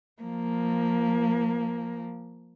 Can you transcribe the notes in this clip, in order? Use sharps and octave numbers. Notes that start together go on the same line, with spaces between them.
F3 A#3